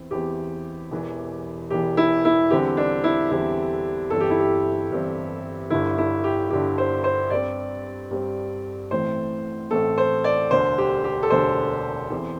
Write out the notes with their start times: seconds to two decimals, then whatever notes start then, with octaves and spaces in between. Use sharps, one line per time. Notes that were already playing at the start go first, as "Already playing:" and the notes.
Already playing: E2 E3 C4
0.11 E2 E3 C4 G4
0.91 E1 E2 E3
1.70 E1 E2 E3 G4
1.97 E4
2.25 E4
2.50 E2 D3 G3 C4 G4
2.77 D4
3.04 E4
3.31 E2 D3 G3 C4 E4
4.10 G1 G2 E3 C4 A4
4.20 G4
4.30 E4
4.39 G4
4.91 G1 G2 E3 C4
5.70 G1 G2 D3 E4
5.98 E4
6.24 G4
6.50 G1 G2 D3 G4
6.78 C5
7.04 C5
7.30 G2 G3 C4 D5
8.11 G2 G3 C4
8.91 A1 A2 E3 A3 C4 C5
9.71 A1 A2 E3 A3 C4 A4
9.98 C5
10.24 D5
10.51 E1 D2 D3 C5
10.78 G4
11.04 G4
11.23 A4
11.30 E1 D2 D3 C5
12.10 E2 E3 C4